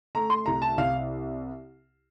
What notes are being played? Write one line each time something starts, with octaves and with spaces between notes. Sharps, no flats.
A3 A#5
C6
C2 A#5
A5
C2 F5